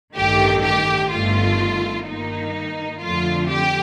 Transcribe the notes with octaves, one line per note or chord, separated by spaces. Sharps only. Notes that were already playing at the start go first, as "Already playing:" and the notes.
A1 G2 D#3 A3 G4
G4
G1 G2 D#3 A3 F4
G2 D#3 A#3 D#4
F2 D3 F3 A3 F4
G4